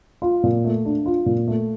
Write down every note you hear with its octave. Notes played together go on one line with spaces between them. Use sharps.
F4
A#2
A3
D4
F4
A#2
A3